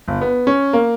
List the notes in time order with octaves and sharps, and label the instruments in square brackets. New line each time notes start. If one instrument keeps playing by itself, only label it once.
[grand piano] G1
B3
C#4
A#3